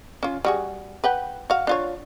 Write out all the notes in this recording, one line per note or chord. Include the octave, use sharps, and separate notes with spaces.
C#4 F4
G3 F#4 G#4
B4 F#5 G5
F#4 F5
D4 F4 C#5